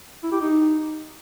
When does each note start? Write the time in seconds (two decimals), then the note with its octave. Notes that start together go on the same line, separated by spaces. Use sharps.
0.23 E4
0.32 G4
0.41 D#4